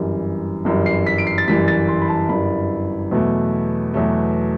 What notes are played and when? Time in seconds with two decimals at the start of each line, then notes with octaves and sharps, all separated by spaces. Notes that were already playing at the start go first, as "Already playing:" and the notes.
Already playing: G1 F#2 E3 G3
0.65 G1 F#2 E3 G3
0.86 C7
1.07 B6
1.18 D7
1.27 C7
1.38 A6
1.48 G1 F#2 E3 G3 B6
1.68 A6
1.88 C6
2.02 B5
2.08 A5
2.29 G1 F#2 E3 G3 B5
3.11 E2 B2 F#3 A3
3.94 E2 B2 F#3 A3